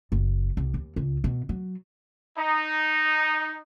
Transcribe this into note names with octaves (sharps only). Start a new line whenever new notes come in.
F#1
C2
D#2
C#2
B2
F#3
D#4